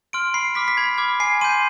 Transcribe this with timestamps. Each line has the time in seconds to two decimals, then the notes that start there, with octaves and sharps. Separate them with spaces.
0.13 C6 F6 D7
0.34 B5 C7
0.55 D6 F6 B6
0.68 B6
0.77 B5 G#6
0.98 D6 F6 G#6
1.20 G#5 C7
1.41 C6 D#7
1.44 G6